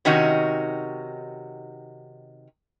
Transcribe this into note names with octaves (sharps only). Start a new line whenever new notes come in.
C3 D#3 C#4 D#4 F#4